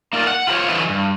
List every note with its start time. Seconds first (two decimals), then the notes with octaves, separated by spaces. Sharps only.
0.13 A#3 D#4 A#4 D5
0.27 F#5
0.47 F4 G4 A#4 C5 C#5
0.69 D3 E3 F#3 B4 D#5
0.89 G2